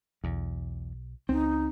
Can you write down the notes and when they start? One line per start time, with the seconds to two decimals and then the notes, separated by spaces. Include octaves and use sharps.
0.24 B1 E2
1.29 C#2 C4 C#4 D#4